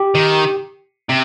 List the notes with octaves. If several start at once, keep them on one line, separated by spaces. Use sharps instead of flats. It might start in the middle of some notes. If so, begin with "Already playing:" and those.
Already playing: G4
D#3
C3